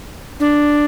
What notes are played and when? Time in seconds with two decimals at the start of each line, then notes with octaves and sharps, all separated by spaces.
0.40 D4